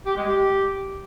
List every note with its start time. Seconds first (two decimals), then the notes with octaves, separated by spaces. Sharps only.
0.05 G4
0.16 G#3
0.26 G4